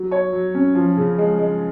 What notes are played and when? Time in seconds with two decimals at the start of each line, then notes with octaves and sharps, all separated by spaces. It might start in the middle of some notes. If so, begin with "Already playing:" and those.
Already playing: F#3
0.11 C#5
0.32 F#3
0.54 C#4
0.75 F3
0.97 C#3
1.18 G#3
1.39 G#3